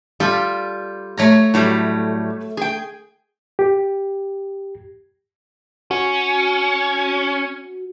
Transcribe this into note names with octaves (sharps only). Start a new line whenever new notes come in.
G3 F4 A4
A3 C#5 A#5
A2 F#3 G3
G#4 G5
G4
C#4 F#4